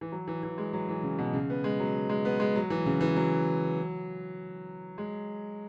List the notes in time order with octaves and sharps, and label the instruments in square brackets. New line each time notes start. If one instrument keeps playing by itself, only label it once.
[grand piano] E3
F#3
E3
E3
G#3
F#3
E3
C#3
B2
C#3
B3
G#3
F#3
G#3
B3
G#3
F#3
E3
C#3
E3
F#3
G#3